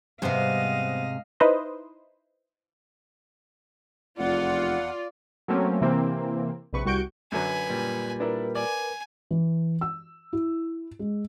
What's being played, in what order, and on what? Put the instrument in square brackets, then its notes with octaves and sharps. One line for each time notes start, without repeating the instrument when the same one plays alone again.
[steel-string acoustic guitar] G#2 C3 [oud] G3 B3 C5 [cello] D#5 F5
[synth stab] D#4 E4 B4 C5 D#5
[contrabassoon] F1 [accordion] E2 F#5 [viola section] F4 [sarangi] D5
[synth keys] F#3 A3 A#3 C4 C#4
C3 E3 A#3 C4
A#1 C3 B4 C#6
C2 G3 F#4 C#6 G6 D7
[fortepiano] F#2 D3 F#3 [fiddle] B4 G#5
[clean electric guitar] A#2 G3
[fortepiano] D4 E4 [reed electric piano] A#4 B4
[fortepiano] D5 [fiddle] G#5
[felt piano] E3
E6
E4
G#3